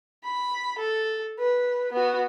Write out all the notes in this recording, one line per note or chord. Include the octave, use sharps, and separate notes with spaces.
B5
A4
B4
B3 F#4